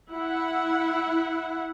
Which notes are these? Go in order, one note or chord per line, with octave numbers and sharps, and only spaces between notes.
E4 F#5